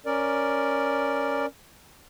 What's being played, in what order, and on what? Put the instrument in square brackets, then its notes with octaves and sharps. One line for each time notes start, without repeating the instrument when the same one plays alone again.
[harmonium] C#4 A#4 D5